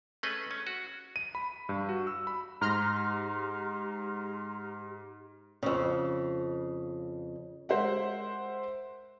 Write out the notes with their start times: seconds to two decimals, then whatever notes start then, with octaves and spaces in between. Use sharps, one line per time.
0.23 A3 C#4 G#4 B4 D#5
0.51 C#4
0.67 F#4
1.16 D#7
1.35 B5
1.69 G2
1.89 F#4
2.07 E6
2.27 B5
2.61 G#2 G4 A#5 C6 F6
5.63 F2 C#3
7.69 G#3 A#4 C5 E5 F#5